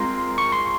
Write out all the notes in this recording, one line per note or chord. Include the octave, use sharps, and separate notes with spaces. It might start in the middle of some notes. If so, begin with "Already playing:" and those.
Already playing: G#3 C4 F4 A#4 C6
C#6
C6